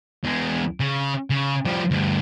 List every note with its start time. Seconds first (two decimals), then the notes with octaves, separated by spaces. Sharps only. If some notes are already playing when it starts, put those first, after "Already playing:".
0.24 E2 G#3
0.80 C#3
1.30 C#3
1.65 F3 G3
1.91 D2 G2